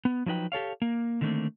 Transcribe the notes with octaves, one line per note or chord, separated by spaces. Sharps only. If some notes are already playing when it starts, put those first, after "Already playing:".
B3
F3 F#3 D#4 B4 G5
G4 A4 C#5 F5
A#3
D3 D#3 F#3 A3 A#3 C4